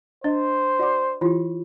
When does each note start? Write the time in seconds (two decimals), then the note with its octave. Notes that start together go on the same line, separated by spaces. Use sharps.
0.24 D4 C5 D#5
0.79 F#4 D5 F#5 D6
1.21 E3 E4 F4 G4